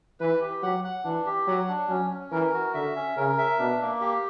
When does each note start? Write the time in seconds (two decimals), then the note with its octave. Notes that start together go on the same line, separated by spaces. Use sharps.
0.20 E3 B4
0.41 G4
0.62 F#3 F#5
0.84 F#5
1.04 E3 D4
1.26 G4
1.47 F#3 F#5
1.68 D4
1.89 F#3 C#4
2.11 C#4
2.31 E3 A#4
2.53 F#4
2.74 D3 E5
2.96 C#4
3.17 C#3 A#4
3.38 E5
3.59 B2 D4
3.81 A#3
4.01 G4